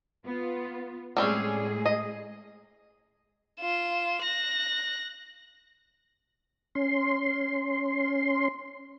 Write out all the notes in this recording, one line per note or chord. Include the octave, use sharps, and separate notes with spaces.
B3 F4
A2 G3 G#3 C4 C#4 G#4
D#5
F4 E7
F#6 A#6
C#4 C6